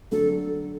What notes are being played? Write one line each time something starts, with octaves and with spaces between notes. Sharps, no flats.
D3 F#3 A4